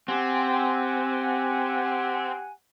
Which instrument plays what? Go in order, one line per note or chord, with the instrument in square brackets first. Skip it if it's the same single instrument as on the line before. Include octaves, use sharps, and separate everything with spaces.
[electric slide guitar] C4 [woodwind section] G4 F#5 G#5